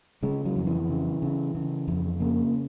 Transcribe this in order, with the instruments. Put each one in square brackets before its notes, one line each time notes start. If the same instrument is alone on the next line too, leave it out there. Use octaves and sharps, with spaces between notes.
[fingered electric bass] C#3 G#3
F#3
F2
E3
C#3
C#3
C#3
F2
C#3 A#3